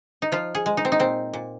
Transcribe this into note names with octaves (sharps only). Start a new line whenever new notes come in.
D#4
F3 F4
G#4
G#3
D#4
C4
D#4
A#2 C4
A#2